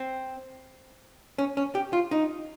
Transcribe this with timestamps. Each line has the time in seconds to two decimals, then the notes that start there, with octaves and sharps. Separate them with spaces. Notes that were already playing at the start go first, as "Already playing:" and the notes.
Already playing: C4
1.38 C#4
1.57 C#4
1.75 G4
1.93 F4
2.11 D#4